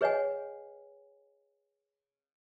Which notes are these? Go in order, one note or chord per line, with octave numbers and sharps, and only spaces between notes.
G#4 B4 C#5 D#5 F#5 G#5